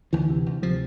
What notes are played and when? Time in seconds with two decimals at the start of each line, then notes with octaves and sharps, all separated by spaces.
0.13 D2 E3
0.30 C3
0.46 D2
0.62 C3 F3